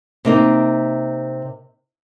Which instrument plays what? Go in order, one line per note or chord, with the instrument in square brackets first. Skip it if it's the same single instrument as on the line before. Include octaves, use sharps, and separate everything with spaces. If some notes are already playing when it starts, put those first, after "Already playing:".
[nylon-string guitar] C3 A#3 D#4